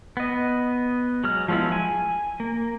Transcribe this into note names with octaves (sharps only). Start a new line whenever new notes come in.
B3 D#5
F#3 G#3 F6
F3 F#3 G#3 B3 E4
G#5
A#3